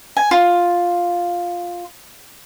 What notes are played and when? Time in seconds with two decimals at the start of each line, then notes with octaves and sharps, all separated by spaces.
0.17 G#5
0.31 F4